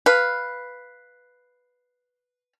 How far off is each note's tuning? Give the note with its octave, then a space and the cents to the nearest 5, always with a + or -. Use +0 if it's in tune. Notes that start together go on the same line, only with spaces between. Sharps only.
B4 +0 F5 +0